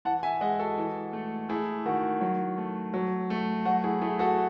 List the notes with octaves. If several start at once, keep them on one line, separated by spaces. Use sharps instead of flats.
E3 F#5 A5
E5 G#5
G#3 D#5 F#5
F#4 A4
E3
A3
A3 E4 G#4
D#3 F#4
F#3
A3
F#3
A3
F#3 F#4
E4 G#4
A3 E4 G#4
F#4 A4